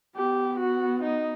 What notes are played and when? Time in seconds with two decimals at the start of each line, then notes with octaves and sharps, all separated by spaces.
0.16 B3 G4
0.59 F#4
1.03 D#4